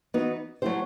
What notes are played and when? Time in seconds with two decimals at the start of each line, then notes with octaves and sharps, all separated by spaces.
0.14 E3 B3 D#4 F#4 B4
0.62 F#3 A3 E4 G4 C5